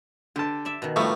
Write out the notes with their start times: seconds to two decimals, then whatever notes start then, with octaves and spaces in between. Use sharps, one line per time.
0.36 D3 G4 A5
0.65 D5 E5
0.82 B2 D#3
0.96 A2 F3 G3 D#4 E5 C#6